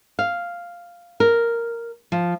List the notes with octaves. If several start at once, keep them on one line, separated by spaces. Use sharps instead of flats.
F5
A#4
F3